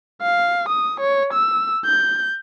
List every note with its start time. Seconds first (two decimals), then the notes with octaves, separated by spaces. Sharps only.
0.22 F5
0.69 D#6
1.00 C#5
1.33 E6
1.85 G6